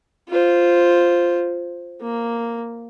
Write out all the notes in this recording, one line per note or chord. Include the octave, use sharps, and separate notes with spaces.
F4 C5
A#3